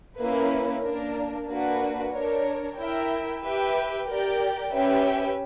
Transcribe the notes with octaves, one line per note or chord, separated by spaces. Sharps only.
A#3 C#4 E4 B4
A#3 D4 A#4
A#3 D4 F#4 B4
D4 A#4 C#5
E4 A#4 E5 G5
G4 B4 E5 G5
G4 A#4 D5 G5
C#4 G4 B4 E5 G5